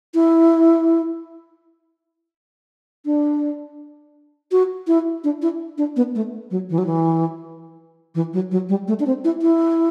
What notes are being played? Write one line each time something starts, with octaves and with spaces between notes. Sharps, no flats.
E4
D4
F#4
E4
D4
E4
D4
B3
A3
F#3
E3
F#3
E3
E3
F#3
F#3
G3
A3
D4
C4
E4
E4